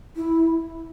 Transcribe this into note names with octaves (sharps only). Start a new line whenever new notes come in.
E4